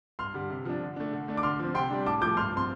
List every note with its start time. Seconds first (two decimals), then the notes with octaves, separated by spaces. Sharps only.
0.19 G2 C6 F6
0.34 D3 G3
0.50 C3
0.65 F3 D4
0.82 D3
0.96 A3 D4
1.13 D3
1.28 A3 D4
1.37 D6
1.43 D3 C6 F6
1.59 F3 C4
1.74 C3 G5 C6
1.90 G3 D4
2.06 A2 A5 D6
2.22 F3 D6 G6
2.25 A3
2.36 G2 C6 F6
2.52 F3 C4 C6